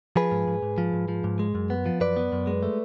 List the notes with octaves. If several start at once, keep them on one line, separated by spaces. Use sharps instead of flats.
F3 G#4 B4
G#2
G#2
G#2
F3
G#2
F3
G#2
G#3
F#2
B3
F3
F#2 B4 D5
B3
F#2
G#3
A3